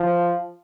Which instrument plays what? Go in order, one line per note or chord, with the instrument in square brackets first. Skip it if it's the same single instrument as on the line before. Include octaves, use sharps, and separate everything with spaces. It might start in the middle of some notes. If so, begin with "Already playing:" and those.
Already playing: [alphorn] F3